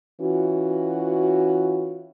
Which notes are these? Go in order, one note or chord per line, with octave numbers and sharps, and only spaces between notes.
E3 C#4 F4 F#4